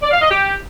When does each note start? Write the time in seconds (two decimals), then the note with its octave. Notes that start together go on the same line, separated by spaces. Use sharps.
0.01 D5
0.11 F5
0.20 D#5
0.30 G4